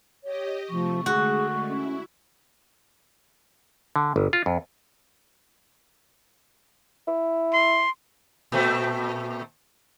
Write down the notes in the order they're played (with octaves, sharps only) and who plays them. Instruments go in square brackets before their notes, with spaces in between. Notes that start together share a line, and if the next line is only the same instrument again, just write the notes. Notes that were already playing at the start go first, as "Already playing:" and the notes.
[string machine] G4 D#5 [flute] C#5
[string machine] C3 A3 [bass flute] F3 [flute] C#6
[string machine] D3 G#3 A3 [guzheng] F#4 [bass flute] G#4
[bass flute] C#4 [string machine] E4
[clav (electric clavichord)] D3
G1
F4
F2
[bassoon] E4
[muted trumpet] C6
[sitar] A#2 A3 C4